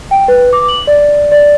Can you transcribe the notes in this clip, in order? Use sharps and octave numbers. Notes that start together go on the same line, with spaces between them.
G5
B4
D6
F#7
D5
D5